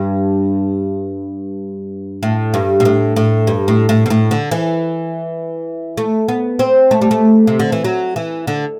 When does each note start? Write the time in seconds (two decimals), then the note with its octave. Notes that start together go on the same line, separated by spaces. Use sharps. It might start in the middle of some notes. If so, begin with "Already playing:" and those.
Already playing: G2
2.23 A2
2.54 G2
2.80 B2
2.85 A2
3.16 A2
3.47 G2
3.68 A2
3.89 A2
4.06 B2
4.10 A2
4.31 D3
4.51 E3
5.97 A3
6.28 B3
6.59 C4
6.91 A3
7.01 G3
7.11 A3
7.47 C3
7.60 D3
7.72 E3
7.85 F#3
8.16 E3
8.47 D3